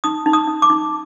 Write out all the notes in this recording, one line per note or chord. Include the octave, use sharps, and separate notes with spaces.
D#4 D#6
D#4
D#6
D#4
D6
D#4